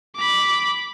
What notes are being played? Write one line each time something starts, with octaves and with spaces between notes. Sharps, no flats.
B5 D6